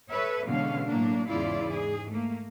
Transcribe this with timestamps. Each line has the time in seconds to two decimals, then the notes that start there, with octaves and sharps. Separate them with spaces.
0.11 A4 B4 C#5 E5
0.46 B2 D3 E3 G#3 C#4 F5
0.87 A2 F#3 A#3 D4
1.28 E2 G#2 C#3 E4 F4 D5
1.69 G#2 G#4
2.10 A3 A#3